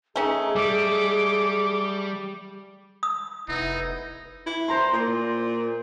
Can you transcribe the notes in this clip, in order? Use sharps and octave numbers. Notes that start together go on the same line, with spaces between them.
A3 C#4 D#4 G#4
G3 D6
D#6
F1 B3 D#4 E4
E4
C5 A#5 C6
A#2